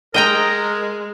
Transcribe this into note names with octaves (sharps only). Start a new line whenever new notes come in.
G#3 A#4 D#5 G5 A#5